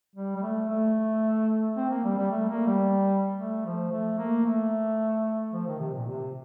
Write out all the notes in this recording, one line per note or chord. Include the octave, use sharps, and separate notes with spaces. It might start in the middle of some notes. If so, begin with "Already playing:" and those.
G3
G3
A3
A3
C4
A#3
G3
G3
A3
A#3
G3
A3
F3
A3
A#3
A3
F3
D#3
C3
A#2
C3